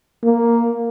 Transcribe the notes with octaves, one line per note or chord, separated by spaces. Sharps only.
A#3